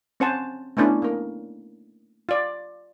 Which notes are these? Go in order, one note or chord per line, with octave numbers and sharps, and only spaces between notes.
C4 C#4 C5 F#5 G#5 A5
A3 B3 C#4 D4 E4 A4
A#3 A#4
F4 D5